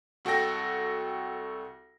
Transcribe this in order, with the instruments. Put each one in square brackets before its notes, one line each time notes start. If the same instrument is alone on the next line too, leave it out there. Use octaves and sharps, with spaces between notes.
[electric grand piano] C2 F#4 A4 G5 A#6